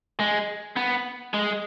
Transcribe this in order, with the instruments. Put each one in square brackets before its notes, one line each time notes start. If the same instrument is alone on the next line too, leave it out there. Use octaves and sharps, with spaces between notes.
[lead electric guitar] G#3
B3
G#3